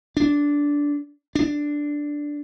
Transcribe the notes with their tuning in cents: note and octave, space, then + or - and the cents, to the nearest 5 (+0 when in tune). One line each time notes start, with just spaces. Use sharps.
D4 -15
D4 +0